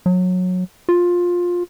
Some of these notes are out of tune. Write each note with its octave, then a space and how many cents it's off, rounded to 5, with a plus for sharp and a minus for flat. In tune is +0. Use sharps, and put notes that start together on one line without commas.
F#3 -20
F4 +15